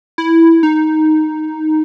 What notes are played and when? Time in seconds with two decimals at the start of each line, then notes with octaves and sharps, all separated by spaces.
0.18 E4
0.63 D#4